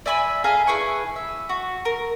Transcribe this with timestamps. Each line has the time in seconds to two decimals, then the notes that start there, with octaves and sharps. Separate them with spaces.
0.06 D5 E5 G#5 B5
0.44 G#4 A4 F5 A#5
0.67 E4 G#4 B4 C#6
1.16 E5
1.49 F#4
1.85 A#4